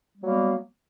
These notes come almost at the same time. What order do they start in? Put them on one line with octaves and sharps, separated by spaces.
G3 F#3 A#3 B3